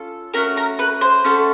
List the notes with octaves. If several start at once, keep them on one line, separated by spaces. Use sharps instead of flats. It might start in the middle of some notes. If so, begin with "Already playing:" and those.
Already playing: C#4 F4 A4
A3 C#4 F#4 A#4 A#5
A#4 A#5
B4 B5
C5 C6
A3 C#4 F#4 A4